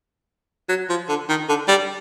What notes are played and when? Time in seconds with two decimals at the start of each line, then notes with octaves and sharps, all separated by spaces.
0.69 F#3
0.89 F3
1.09 D3
1.29 D#3
1.49 D3
1.68 G3